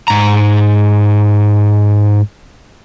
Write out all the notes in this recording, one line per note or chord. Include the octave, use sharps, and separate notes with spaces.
G#2 A#5